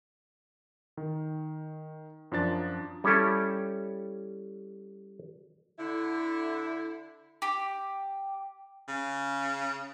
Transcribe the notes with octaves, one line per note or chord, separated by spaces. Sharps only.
D#3
F#2 F3 D4 A6
G3 C#4 E4 G4 A4
D3 E4
G4
C#3